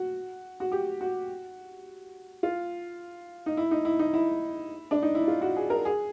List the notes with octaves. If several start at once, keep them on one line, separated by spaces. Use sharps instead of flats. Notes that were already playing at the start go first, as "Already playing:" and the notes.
Already playing: F#4
F#4
G4
F#4
F4
D#4
E4
D#4
E4
D#4
E4
D4
D#4
E4
F4
F#4
G#4
A#4
G#4